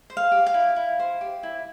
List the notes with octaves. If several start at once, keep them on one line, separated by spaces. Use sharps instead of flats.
C5
F5
G4
F5
E4
E4
C5
G4
E4